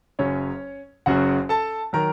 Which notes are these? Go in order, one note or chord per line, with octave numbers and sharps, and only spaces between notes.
F#1 F#2 C#3 F#3 C#4 C#5
F#1 F#2 C#3 F#3 F#4 F#5
A4 A5
D#3 F#3 A#4 A#5